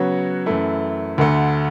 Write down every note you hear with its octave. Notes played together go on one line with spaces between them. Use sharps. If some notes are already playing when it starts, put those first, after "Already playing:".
Already playing: C#3 F#3 B3 F#4 C#5
F#2 E3 A3 E4
D2 D3 A3